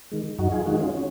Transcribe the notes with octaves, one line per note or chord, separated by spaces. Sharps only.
D#3 G#3
F#2 D#4 F#4
F4 G#4
D#3 G#3 D#4 F#4
C#4 F4
C#4